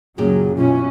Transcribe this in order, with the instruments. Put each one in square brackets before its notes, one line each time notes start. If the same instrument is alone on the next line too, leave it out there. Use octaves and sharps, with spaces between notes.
[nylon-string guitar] F#2 A#2 G4 [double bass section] C#3 F#3 [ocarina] G#4
[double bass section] B2 E3 C#4 [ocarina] F4